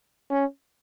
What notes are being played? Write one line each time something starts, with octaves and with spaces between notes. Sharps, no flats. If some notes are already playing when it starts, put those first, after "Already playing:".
C#4